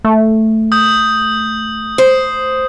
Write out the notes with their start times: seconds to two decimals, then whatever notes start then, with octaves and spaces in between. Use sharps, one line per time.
0.05 A3
0.72 D#6 G6
1.98 C5